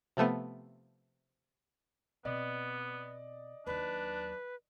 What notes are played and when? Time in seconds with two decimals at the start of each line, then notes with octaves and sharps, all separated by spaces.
0.17 C3 F3 A3 B3
2.25 B2 B3 C4 D5 D#5
3.66 D#2 F#3 D4 B4